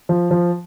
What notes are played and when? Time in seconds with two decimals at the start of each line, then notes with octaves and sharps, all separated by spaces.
0.09 F3
0.31 F3